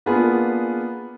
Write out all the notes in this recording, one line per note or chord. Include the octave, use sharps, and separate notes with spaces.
A#3 B3 D4 F4 G#4